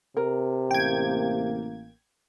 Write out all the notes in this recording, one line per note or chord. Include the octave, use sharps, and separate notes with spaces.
C3 A#4
A1 A#3 G5 G#6